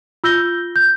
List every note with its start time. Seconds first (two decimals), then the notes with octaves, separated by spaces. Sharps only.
0.24 F4 E6 G6 A#6 G7
0.76 G6